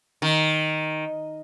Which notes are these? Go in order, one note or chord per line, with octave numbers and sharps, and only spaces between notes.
D#3